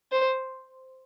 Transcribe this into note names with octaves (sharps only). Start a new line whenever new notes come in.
C5